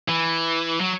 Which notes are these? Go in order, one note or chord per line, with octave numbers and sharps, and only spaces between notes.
E3
F#3